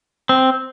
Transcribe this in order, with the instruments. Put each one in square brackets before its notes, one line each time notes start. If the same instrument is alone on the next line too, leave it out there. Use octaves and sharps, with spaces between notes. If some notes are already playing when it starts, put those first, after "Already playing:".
[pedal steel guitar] C4